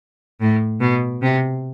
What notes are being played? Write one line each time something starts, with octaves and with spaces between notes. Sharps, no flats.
A2
B2
C3